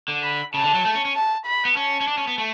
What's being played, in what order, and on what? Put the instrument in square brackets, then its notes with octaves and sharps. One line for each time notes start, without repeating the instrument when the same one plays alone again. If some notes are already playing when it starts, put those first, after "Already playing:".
[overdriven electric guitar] D3
[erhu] B5
[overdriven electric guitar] C#3 [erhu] A5
[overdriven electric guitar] D3
F#3
A3
C#4
C#4
[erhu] A5
B5
[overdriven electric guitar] B3
[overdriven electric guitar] C#4 [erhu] A5
[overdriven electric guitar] C#4
D4
C#4
B3
A3